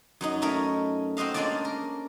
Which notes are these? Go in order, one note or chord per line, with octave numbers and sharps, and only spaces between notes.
F#2 F#3 D#4
A3 C#4 D#4 A#4 C#5
C4 F#4 C5 D#5 F5
G#3 A#3 C#4 D4 F4 D5
A#4